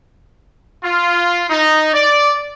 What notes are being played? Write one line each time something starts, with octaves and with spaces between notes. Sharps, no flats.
F4
D#4
D5